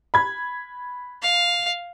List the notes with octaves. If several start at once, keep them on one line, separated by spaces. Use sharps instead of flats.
B5 G#6
F5